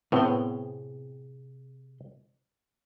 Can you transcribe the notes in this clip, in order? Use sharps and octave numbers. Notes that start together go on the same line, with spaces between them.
A2 C3 B3 C4 G#4 C6